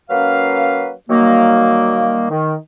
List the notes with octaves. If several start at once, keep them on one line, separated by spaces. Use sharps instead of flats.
F#3 A#3 C#4 B4 F5
D#3 F#3 G3 A#3
D#3